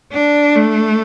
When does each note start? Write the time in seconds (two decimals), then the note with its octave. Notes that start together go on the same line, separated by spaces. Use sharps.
0.13 D4
0.56 A3